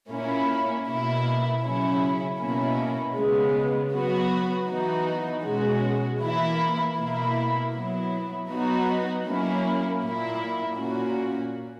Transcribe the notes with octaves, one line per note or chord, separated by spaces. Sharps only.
A#2 A#3 C#4 E4
B2 A#3 E4
C#3 F#3 C#4 E4
B2 A#3 C#4 E4
C#3 G#3 B3
F#3 B3 F#4
E3 B3 D#4 F#4
B2 G#3 C#4 F#4
E3 A#3 E4
B2 A#3 E4
F#3 B3 E4
F#3 B3 D#4 F#4
F#3 A#3 C#4 E4
A#2 A#3 E4
A#2 A#3 C#4 F#4